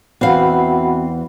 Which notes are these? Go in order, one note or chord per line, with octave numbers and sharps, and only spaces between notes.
E2 E3 C4 F#4 F5 F#5 B5